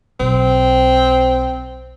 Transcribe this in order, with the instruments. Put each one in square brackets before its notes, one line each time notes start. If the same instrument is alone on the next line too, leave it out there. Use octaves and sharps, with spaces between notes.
[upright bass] B1 [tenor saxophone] C4